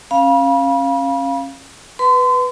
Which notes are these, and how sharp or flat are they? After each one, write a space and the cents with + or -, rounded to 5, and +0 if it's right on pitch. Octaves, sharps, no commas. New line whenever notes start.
C#4 -30 F5 +0 B5 -35
B4 +0 C6 -35